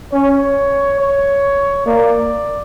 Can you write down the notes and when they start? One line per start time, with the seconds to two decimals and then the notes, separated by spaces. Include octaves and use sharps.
0.12 C#4 C#5
1.00 C#5
1.87 A#3 D5